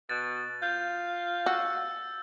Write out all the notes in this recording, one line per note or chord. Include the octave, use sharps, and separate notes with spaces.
B2 A6
F4 G6
F#4 E6